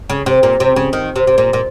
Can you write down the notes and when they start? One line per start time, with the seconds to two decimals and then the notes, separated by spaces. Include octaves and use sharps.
0.10 C#3
0.26 C3
0.43 A#2
0.60 C3
0.76 C#3
0.93 D#3
1.16 C3
1.27 C3
1.38 A#2
1.53 A#2